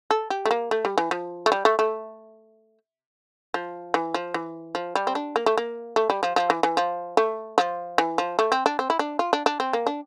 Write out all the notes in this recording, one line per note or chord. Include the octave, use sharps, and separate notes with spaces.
A4
G4
A3
A#3
A3
G3
E3
F3
A3
G3
A3
A3
F3
E3
F3
E3
F3
G3
C4
D4
A#3
A3
A#3
A3
G3
F3
F3
E3
E3
F3
A3
F3
E3
F3
A3
C4
D4
C4
E4
D4
F4
D4
D4
C4
A#3
D4